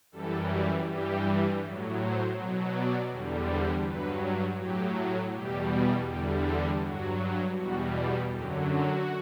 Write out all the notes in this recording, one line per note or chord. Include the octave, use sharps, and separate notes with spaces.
F#2 E3 G3 A4
G2 E3 G3 G4
A2 F#3
C5
B2 F#3
D5
E2 D3 G3
C5
G2 F#3 B4
A2 F#3 G4
E2 B2 G3 G4
E2 D3 G3 G4
A4
G2 F#3 F#4
E2 B2 G3 F#4
F#2 D3 F#3 G4
F#4